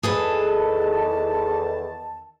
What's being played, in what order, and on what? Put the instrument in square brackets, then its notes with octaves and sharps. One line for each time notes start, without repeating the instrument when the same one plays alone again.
[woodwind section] E2 D#3 A5 [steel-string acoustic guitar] G#4 A4 B4